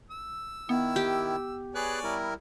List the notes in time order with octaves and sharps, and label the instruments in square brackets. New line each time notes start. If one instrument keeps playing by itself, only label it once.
[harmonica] E6
[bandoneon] D#3 E4 [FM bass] B3
[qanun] G4
[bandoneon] G#4 B4 F#6 [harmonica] C#5 D5 G#5
[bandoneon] G3 E4 A#4